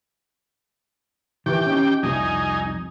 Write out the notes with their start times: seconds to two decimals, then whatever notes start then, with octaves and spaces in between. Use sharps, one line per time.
1.46 D#3 E3 G4 G5
1.66 C#4 D#4
2.03 C2 F2 D#4 G#5